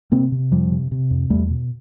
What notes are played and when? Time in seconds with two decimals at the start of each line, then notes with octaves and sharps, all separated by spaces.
0.12 C3 A#3 C4
0.32 C3
0.51 F2 F3 G3
0.71 C3
0.91 C3
1.11 F2
1.30 E2 G3 A3
1.50 B2